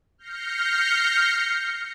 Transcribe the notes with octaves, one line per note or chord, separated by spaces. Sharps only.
F6 G6 A#6 C7 C#7